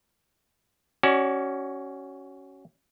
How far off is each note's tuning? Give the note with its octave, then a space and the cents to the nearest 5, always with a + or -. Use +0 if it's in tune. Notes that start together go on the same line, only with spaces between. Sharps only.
C#4 +0 F#4 +25 D5 -5